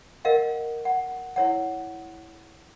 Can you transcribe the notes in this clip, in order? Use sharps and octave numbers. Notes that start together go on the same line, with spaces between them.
A#4 D#5 F5 F#5
F#5
E4 C#5 F#5